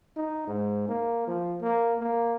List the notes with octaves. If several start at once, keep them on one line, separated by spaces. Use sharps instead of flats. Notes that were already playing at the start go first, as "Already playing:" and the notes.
D#4
G#2
A#3
F3
A#3
A#3